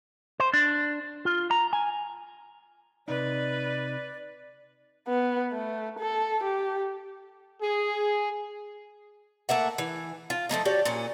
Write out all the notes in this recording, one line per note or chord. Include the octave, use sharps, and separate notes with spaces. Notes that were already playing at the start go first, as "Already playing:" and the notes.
C5
D4
F4
A#5
G#5
C3 D#4 B4 D5
B3
A3
A4
G4
G#4
A3 A#3 E5 F#5
E3
F4
F3 A3 A#3 D#4
F#4 G4 C#5 D5
A#2 C#4